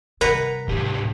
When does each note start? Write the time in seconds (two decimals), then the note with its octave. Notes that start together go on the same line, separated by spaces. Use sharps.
0.21 C3 G3 A#4 B4 F#5 A#5
0.68 D1 G#2 C3 G3